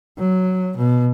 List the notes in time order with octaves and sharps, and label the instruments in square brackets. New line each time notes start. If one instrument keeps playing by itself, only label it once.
[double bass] F#3
B2